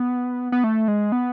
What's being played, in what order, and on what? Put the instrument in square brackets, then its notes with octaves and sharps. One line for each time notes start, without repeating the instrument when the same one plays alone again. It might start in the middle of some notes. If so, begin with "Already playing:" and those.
Already playing: [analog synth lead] B3
B3
A3
G#3
B3